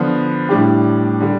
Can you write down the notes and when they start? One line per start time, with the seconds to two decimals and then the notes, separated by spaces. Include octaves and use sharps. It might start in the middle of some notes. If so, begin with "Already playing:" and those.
Already playing: D3 F3 B3
0.49 A2 G3 D4 G4
1.20 D3 G3